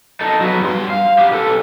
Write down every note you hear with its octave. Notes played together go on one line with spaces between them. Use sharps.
D#4 A4
F#3 B3
G2 C6
F5
B3 G4
B1 A4